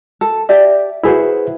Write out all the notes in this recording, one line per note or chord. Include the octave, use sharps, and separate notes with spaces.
A4
G4 D5 E5
E4 F#4 G#4 B4 C5 E5